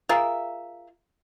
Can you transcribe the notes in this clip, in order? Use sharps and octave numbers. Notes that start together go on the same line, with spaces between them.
F4 G#4 A#4 E5